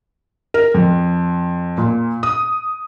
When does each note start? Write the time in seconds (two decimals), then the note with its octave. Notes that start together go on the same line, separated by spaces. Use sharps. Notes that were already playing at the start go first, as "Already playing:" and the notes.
0.54 A#4
0.74 F2
1.78 A#2
2.23 D#6